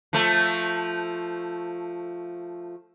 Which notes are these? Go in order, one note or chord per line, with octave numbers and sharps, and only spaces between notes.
F3 A3